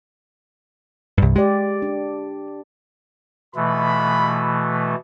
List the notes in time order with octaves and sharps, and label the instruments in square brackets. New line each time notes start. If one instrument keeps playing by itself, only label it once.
[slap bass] C2 G2
[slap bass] G#3 [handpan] G4 D5
[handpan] D4
[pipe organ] B2 E3 A3 [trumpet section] G#3 F4 B5